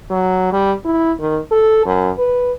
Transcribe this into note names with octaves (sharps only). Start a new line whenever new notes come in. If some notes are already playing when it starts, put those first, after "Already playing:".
F#3
G3
E4
D#3
A4
F#2
B4